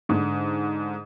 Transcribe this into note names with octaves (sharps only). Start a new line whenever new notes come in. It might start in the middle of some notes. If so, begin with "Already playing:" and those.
G#2 D3